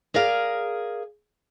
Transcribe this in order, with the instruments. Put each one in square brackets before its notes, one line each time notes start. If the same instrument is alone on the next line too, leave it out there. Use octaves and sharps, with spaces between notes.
[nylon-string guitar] G#4 A#4 D5 F5